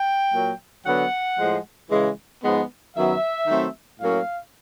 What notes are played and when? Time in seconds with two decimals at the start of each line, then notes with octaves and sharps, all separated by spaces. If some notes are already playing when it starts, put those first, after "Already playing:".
Already playing: G5
0.32 A#2 F#3 A#3
0.85 D3 F#3 B3 F#5
1.38 A2 F3 G#3
1.90 C#3 E3 G#3
2.42 G#2 F3 G#3 B3
2.95 F#2 D#3 F#3 B3 E5
3.47 D#3 F#3 A3 C4
4.00 A2 F#3 A#3 C#4 F5